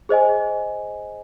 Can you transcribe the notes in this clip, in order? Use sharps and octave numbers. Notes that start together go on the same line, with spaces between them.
G#4 C5 D#5 G#5